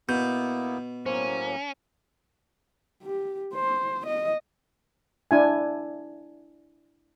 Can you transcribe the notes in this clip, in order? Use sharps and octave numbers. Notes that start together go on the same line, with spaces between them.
B2 A#3 B3 E4 G6
A2 F#3 A#3 C#4 C5
G4
C5
D#5
D4 E4 G#5